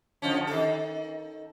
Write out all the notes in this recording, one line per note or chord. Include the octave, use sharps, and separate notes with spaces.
D3 F3 C#4
D#3 A4